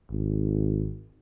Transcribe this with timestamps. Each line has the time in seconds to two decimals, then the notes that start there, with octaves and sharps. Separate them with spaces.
0.11 G#1